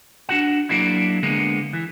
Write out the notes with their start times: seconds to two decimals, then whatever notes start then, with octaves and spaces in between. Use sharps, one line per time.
0.29 D4 F#4 F#5
0.69 F#3 A#3 D4 E4
1.23 D3 G#3 A#3 B3
1.73 E3